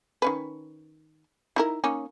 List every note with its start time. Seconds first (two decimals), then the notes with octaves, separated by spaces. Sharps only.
0.22 D#3 C#4 B4
1.56 D#4 E4 A#4
1.84 A#3 C#4 D#4